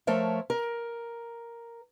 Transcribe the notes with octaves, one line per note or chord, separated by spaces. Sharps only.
F3 A3 A#4 C#5 E5
A#4